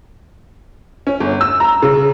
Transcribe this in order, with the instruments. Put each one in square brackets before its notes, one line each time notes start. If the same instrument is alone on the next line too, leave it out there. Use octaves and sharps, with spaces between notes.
[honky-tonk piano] C#4
G1
E6
A#5
C#3